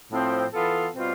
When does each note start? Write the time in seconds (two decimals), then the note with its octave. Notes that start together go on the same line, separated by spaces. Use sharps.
0.12 A2 F3 C4
0.53 E3 B3 F4 A4
0.96 B2 G3 C4 F4